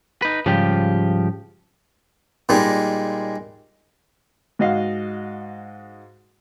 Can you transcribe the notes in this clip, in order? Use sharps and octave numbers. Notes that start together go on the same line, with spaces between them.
D#4 B4
G#2 C#3 F3 G3 G4
A#2 G3 G#3 D#4
G#2 F#4 D#5 F5